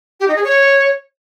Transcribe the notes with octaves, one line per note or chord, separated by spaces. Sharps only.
G4
D#4
G#4
C#5